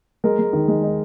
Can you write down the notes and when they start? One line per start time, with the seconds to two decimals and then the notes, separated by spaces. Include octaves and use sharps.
0.24 G#3 A#4
0.39 G#3
0.53 D#3
0.68 G#3
0.83 D#4